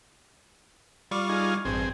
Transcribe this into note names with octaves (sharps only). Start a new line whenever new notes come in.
G3 F4 C#6 D6
D#4 F4 G#4
A1 G2 C4 G#4